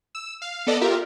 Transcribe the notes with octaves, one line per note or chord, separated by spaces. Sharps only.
E6
F5
B3 A4 D5 D#5
F4 G4 A#4 E5